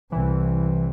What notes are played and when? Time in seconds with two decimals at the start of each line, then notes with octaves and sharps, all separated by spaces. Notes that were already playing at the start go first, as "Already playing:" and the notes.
0.12 C2 C3 E3